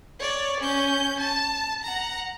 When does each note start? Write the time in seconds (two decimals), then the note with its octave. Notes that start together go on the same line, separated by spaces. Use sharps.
0.19 C#5 D5
0.60 C#4 G6
1.20 A5
1.83 F#5 A#5